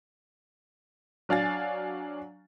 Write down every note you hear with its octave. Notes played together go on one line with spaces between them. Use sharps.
F#3 D4 F5 G#5 A6